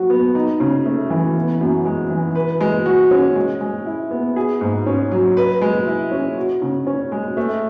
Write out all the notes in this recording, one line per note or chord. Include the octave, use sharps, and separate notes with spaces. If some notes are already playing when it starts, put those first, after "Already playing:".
Already playing: F#3 F#4
B3
D#4
C#3
A3
E3
B3
F#2
G#3
E3
B4
G#3
F#4
C#4
G#3
G#3
E4
B3
G#4
G#2
C#4
F#3
B4
G#3
E4
C#4
F#4
C#3
C#4
G#3
A3